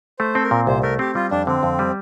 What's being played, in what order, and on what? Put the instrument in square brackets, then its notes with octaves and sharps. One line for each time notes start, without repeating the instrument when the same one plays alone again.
[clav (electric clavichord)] A3 [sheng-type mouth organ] C5
[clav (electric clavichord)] C4 [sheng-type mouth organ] A4
[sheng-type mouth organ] A#4
[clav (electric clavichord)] A#2
[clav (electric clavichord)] C2 [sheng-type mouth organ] C5
[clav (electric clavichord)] A3 [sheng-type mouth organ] A#4
[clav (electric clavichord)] C4 [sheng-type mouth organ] G4
[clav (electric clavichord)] G3 [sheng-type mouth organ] F4
[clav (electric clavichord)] F2 [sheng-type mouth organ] D4
[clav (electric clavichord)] D3 [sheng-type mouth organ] C4
[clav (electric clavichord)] F2
G3